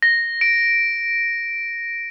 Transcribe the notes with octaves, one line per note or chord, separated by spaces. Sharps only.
A#6
D7